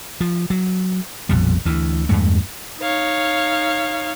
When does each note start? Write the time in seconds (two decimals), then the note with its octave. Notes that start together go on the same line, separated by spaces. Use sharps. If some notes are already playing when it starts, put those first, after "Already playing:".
0.21 F3
0.50 F#3
1.29 A#1 F2 B2 G3
1.65 D2 E3
2.09 E2 G2 G#3 A3
2.79 D#4 C#5 F5